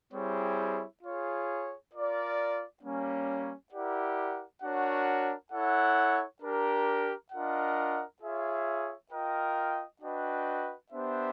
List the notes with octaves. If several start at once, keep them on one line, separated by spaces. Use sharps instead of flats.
G3 C4 E4 G#4 C#5
F4 G#4 C#5
F4 A#4 D5
G3 A#3 C#4
E4 G4 A#4 D5 F#5
D4 F#4 A#4 C#5 F#5
E4 A4 C#5 F#5
D4 G4 A#4
D4 F4 A#4 D#5 F#5
F4 G#4 C#5 E5
F4 A#4 D#5 G5
D4 F#4 B4 D#5 G5
B3 D4 G4 C5 E5